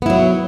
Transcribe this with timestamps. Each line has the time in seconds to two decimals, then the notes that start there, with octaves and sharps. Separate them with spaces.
0.02 B3
0.06 E4
0.10 F#3